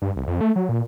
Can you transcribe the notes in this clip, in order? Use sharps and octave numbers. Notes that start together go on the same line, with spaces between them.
G2
C2
F2
A3
F#3
A#2